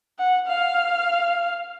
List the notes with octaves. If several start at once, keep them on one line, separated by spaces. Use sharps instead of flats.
F#5
F5